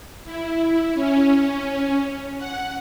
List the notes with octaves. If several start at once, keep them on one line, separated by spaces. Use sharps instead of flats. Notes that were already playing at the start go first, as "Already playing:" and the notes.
E4
C#4
F#5